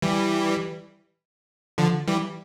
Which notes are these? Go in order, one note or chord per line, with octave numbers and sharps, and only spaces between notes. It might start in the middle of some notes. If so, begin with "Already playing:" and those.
E3 G3
D3 F3
E3 G3